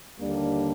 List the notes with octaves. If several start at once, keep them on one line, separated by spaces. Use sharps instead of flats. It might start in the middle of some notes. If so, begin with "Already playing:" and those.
D#2 D3 G3 A#3 D4